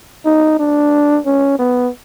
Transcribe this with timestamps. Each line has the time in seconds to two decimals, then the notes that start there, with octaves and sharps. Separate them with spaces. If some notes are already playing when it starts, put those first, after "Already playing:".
0.26 D#4
0.59 D4
1.26 C#4
1.59 B3